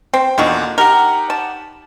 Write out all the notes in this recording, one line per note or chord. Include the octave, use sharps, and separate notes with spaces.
C4 G5
E2 A#2 D3 D#3 F#4
D#4 G4 A#4 F#5
A5